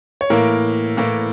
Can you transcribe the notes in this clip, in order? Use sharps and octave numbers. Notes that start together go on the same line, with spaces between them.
C#5
A2 E3 A#3 A#4
A2 E3 A#3